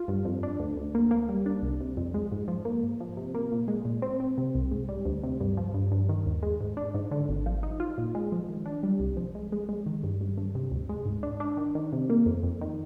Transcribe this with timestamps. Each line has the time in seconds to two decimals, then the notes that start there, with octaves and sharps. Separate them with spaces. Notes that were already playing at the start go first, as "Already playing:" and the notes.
Already playing: F4
0.08 G2
0.25 F2
0.43 D4
0.59 D2
0.77 D2
0.95 A#3
1.11 A#3
1.29 G3
1.46 D4
1.62 C2
1.80 C3
1.97 F2
2.14 G#3
2.32 G#2
2.48 F3
2.65 A#3
2.83 G#2
3.00 F3
3.17 C3
3.34 A#3
3.52 A#2
3.68 G#3
3.85 A#2
4.02 C4
4.20 C4
4.38 C3
4.55 C2
4.71 G#2
4.89 G3
5.05 D2
5.24 C3
5.40 G2
5.57 F3
5.74 G2
5.92 G2
6.09 D#3
6.26 D#2
6.43 G#3
6.61 G#2
6.77 D4
6.94 G#2
7.11 D3
7.29 G#1
7.46 F3
7.63 D#4
7.80 F4
7.98 A#2
8.15 G#3
8.32 F3
8.48 D#3
8.66 D4
8.83 G3
9.00 C2
9.17 F3
9.35 G#3
9.52 G#3
9.69 G#3
9.86 D#3
10.03 G2
10.21 G2
10.38 G2
10.55 C3
10.71 D2
10.89 G#3
11.06 G#2
11.23 D4
11.40 D4
11.57 D#3
11.75 D#3
11.93 C3
12.10 A#3
12.26 F2
12.43 F2
12.61 D#3